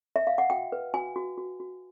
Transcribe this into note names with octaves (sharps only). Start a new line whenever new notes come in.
E5
F5
F#5
F#4 G5
B4
F#4 G#5
F#4
F#4
F#4